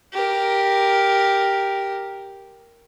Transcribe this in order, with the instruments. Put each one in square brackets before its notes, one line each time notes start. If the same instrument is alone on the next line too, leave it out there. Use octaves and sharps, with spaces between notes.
[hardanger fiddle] G4 A#4